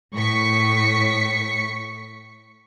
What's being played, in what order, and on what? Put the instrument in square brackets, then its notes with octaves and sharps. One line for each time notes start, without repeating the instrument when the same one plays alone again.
[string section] A2 C#6 B6 C#7